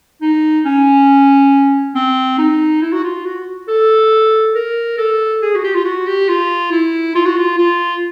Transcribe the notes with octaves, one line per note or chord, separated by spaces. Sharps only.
D#4
C#4
C4
D#4
E4
F#4
F4
F#4
A4
A#4
A4
G#4
F#4
G4
F4
F#4
G4
F4
E4
F4
F#4
F4
F4